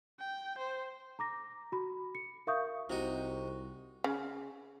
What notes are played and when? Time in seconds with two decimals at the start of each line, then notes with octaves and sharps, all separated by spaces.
0.19 G5
0.58 C5
1.19 A#5 D6 A#6
1.72 F#4 B5
2.15 C#7
2.47 A#4 E5 F5 C#6 D#6 G6
2.90 C2 C3 D#4 F#4
4.04 C#3